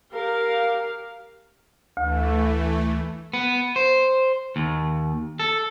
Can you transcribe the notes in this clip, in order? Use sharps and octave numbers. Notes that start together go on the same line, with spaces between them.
G4 A#4 F5
D2 E3 A3
B3
C5
D#2
A4